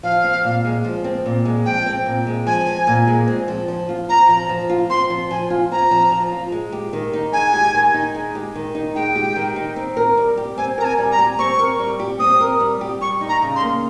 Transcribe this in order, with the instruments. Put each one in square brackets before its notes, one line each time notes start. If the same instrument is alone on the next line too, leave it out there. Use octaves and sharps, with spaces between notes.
[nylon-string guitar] F3 [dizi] F5
[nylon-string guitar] C4
A#2
G#3
F3
C4
A#2
G#3
[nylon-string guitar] F3 [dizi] G5
[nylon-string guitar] C4
A#2
G#3
[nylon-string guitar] F3 [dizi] G#5
[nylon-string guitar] C4
A#2
G#3
C4
F3
F3
F4
[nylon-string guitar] C4 [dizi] A#5
[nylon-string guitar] F3
F3
F4
[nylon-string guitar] C4 [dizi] C6
[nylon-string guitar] F3
[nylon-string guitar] F3 [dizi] G#5
[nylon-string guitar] F4
[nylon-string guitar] C4 [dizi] A#5
[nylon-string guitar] F3
F3
F4
G#3
G4
D#3
D#4
[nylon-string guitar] G#3 [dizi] G#5
[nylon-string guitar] G4
D#3
D#4
G#3
G4
D#3
D#4
[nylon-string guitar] G#3 [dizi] G5
[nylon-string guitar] G4
D#3
D#4
C4
A#4
G3
G4
[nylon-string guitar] C4 [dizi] G#5
[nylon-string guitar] A#4 [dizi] A#5
[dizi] G#5
[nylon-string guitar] G3
[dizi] A#5
[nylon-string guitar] G4
[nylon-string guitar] C4 [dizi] C#6
[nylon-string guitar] A#4
G3
G4
[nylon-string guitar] C4 [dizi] D#6
[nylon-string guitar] A#4
G3
G4
[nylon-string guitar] G3 [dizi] C#6
[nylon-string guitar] D#4
[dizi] A#5
[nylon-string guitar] C#3
[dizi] C6
[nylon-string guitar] A#3